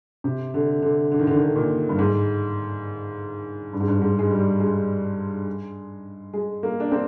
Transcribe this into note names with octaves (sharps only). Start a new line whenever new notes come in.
C3
D3
D3
D3
D#3
D3
D#3
D3
A#2
G2
G#2
G2
G#2
G2
G#2
G#3
G3
G#3
G#3
A#3
D4
C4